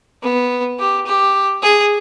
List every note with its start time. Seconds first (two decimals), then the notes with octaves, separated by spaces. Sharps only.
0.23 B3
0.79 G4
1.06 G4
1.63 G#4